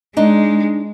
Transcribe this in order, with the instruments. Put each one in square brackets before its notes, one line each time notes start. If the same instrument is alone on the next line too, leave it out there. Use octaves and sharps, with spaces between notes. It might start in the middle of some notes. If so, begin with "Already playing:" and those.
[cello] G#3 [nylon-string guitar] D4 D#4